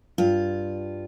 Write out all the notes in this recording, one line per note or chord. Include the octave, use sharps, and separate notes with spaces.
G2 F4